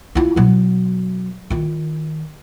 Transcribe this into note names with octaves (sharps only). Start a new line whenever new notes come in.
E4 F4
B2 F#3
D#3 F4